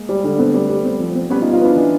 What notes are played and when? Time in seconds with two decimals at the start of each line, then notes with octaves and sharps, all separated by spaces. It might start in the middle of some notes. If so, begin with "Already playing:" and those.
Already playing: G#3 A#3
0.09 G3
0.24 D3
0.38 A3 B3 C4
0.54 G3
0.69 G3
0.85 C4
1.00 F3
1.15 C4
1.30 G3 B3 C#4
1.41 D#4 F4
1.46 B3
1.53 D#4 F4
1.61 B3 D4 E4
1.76 E3